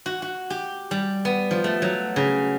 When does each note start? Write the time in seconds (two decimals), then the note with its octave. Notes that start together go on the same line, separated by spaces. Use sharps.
0.06 F#4
0.22 F#4
0.50 G4
0.91 G3
1.25 B3
1.51 F3
1.64 A3
1.82 F#3
2.16 C#3